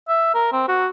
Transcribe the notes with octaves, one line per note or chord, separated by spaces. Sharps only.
E5
A#4
C4
F#4